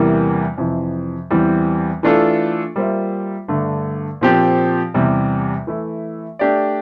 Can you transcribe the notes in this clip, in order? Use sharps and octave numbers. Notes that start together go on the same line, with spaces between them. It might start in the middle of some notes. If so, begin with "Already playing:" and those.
Already playing: E2 C3 E3 G3 A#3
F2 C3 E3
E2 E3 G3 C4
E3 A3 D4 F4 A4
G3 A#3 F4 C5 E5
G2 D3 A3
A#2 F3 C4 G4
E2 C3 G3
E3 A3 E4
A3 D4 G4 D5